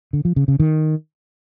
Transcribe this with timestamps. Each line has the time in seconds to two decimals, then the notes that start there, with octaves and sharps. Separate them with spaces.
0.13 D3
0.25 F3
0.36 C#3
0.48 C#3
0.60 D#3